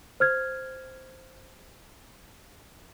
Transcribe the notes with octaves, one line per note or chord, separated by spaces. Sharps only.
C5 F6 G#6